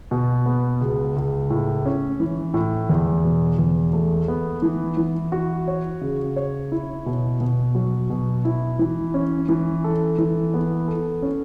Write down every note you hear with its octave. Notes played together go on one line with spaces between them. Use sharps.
B2
B3
C#2
C#2
A2
C#4
E3
A2
E2
B2
E2
A3
B3
E3
E3
F#4
C#5
C#3
C#5
E4
B2
B2
F#3
B2
E4
E3
C#4
E3
A4
E3
B3
A4
C#4